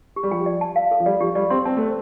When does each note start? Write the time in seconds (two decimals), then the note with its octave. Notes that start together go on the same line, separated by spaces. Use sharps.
0.16 G4
0.23 G3
0.31 F3 G5
0.46 D5
0.61 A5
0.76 F5
0.91 A4
1.00 F3
1.06 G3 D5
1.20 F3 G4
1.35 G3 D5
1.50 C4 C6
1.65 C4 A5
1.77 A3 C5